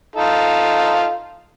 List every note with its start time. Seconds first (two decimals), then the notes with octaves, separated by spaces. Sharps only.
0.16 D#4 F4 A4